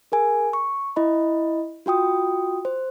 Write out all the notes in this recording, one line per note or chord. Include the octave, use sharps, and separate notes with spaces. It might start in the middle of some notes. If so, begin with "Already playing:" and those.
G#4 A#4 G#5
C#6
E4 D#5 B5
F4 F#4 G5 D#6
C5